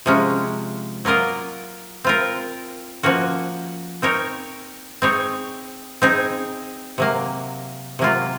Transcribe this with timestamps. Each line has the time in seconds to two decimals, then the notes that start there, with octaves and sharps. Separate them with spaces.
0.06 C3 F3 G#3 C#4
1.05 F#3 A#3 F4 A#4 D#5
2.04 C4 F4 A#4
3.03 F3 A#3 C#4 F#4
4.02 C4 D#4 A#4 C#5
5.02 C4 D#4 G#4 C#5
6.02 C4 D#4 G#4
6.98 C3 F#3 A#3
7.99 C3 F#3 A#3 F4